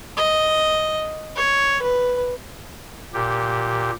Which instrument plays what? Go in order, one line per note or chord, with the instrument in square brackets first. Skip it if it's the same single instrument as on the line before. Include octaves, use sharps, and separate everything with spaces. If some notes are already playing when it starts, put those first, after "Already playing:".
[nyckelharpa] D#5
C#5
B4
[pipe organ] A#2 G4